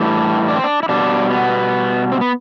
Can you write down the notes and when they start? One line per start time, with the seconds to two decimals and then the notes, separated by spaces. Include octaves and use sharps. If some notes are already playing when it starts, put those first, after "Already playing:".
Already playing: A2 E3 G3 D4
0.48 D4
0.56 C4
0.64 D4
0.83 E4
0.89 B2 G3 D4
1.30 B3
2.12 C4
2.21 B3